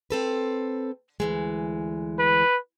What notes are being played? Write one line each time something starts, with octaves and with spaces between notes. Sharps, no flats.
C4 A4 B4
D2 E3 G#3
B4